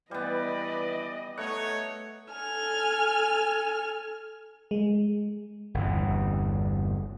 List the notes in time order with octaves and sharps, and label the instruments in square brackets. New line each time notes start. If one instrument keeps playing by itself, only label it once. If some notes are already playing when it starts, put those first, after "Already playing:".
[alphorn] E3 [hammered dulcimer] G3 B3 [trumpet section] B4 D5 [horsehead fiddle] D#5
[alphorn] A3 [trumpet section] D#4 C#5 [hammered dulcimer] F#5
[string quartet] A4 G#5 F6
[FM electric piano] G#3
[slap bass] G1 E2